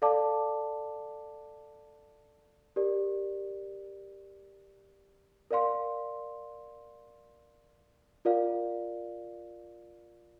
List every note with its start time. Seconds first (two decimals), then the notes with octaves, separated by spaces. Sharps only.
0.02 A4 D5 F5 A5 D6
2.76 G4 A#4 D5
5.51 A#4 D5 F5 C6
8.25 F4 A#4 D5 F5